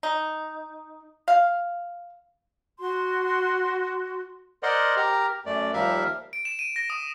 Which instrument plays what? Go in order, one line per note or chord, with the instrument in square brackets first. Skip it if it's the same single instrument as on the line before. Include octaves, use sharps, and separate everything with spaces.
[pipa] D#4
F5
[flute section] F#4 C6
[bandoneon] A#4 C5 D5 D#5 F#5 C6
G4 A#4 A#5
F#2 A3 D5
D#2 F3 G3 A#4 E5 F5
[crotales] D7
E7
D#7
A#6
D#6